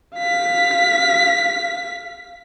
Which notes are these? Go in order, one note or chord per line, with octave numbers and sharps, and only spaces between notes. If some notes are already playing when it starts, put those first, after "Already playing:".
F5 B6